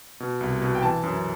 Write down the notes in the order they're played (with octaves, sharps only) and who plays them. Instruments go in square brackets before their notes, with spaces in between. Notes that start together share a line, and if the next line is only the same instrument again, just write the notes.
[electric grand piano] B2
C2
B2
G5
E3 A5
F#2